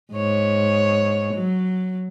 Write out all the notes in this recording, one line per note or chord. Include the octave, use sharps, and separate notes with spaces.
G#2 C#5
F#3